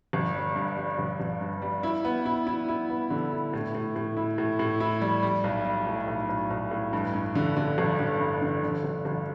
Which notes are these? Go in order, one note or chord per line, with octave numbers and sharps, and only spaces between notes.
G1
G3
G2
G3
G1
G1
G2
G3
E4
B3
E4
E4
E4
B3
D3
E4
A2
A2
A2
E4
A2
A2
E4
G3
G3
B1
G3
A2
B1
B1
B1
A2
G2
G2
D3
D3
G1
D3
G2
D3
D3
G1
G1